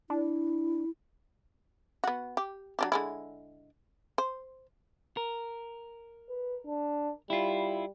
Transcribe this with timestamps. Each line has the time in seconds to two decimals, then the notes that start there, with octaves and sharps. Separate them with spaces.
0.10 D4 E4
2.04 B3 F#4
2.37 G4
2.79 F#3 D4 G4
2.92 D3 G#3 E4
4.18 C5
5.17 A#4
6.29 B4
6.66 D4
7.30 G3 E4 F4